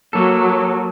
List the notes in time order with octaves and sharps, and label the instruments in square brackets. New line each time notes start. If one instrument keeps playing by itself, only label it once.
[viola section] F#3 [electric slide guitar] A#3 A4